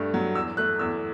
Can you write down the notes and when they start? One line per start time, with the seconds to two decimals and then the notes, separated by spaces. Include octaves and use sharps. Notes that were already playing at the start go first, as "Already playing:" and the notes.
Already playing: G2 A3
0.14 F#3
0.35 E2 E6
0.57 A3 F#6
0.79 E2 E6